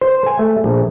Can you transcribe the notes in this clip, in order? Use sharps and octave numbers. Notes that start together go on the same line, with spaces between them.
C5
G#5
A3
A#1